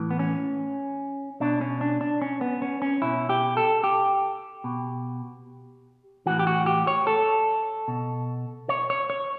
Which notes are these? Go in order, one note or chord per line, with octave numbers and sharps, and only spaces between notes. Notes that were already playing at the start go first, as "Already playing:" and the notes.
Already playing: A2 E3
B3
C#4
B2 D4
C#4
D4
D4
C#4
B3
C#4
C#4
B2 E4
G4
A4
G4
B2
A2 E3 F#4
G4
F#4
G4
C#5
A4
B2
C#5
C#5
C#5